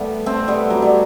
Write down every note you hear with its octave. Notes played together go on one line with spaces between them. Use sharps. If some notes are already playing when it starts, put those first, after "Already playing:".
Already playing: G3 A3 B3
A3 C4
G3 B3
F#3
G3